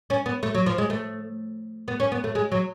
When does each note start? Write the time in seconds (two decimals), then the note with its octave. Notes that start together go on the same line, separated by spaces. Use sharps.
0.10 C#4
0.26 B3
0.43 A3
0.55 F#3
0.66 F3
0.78 G#3
0.90 A3
1.88 B3
2.00 C#4
2.12 B3
2.24 A3
2.35 G#3
2.52 F#3